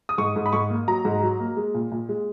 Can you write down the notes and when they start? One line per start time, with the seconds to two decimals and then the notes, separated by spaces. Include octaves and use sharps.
0.09 D#6
0.18 G#2 C#6
0.36 G#2
0.46 B5
0.53 G#2 C#6
0.70 A#3
0.88 F#3 A#5
1.05 G#2
1.23 F#3
1.40 A#3
1.57 G#3
1.75 A#2
1.92 A#2
2.09 G#3